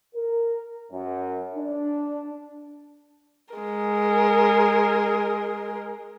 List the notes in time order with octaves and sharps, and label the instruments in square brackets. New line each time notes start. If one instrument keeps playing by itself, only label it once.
[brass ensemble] A#4
F#2
D4
[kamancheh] G#3 A#4